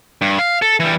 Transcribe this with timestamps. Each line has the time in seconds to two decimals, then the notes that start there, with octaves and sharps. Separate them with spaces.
0.22 G2
0.39 F5
0.62 A4
0.80 E3 G3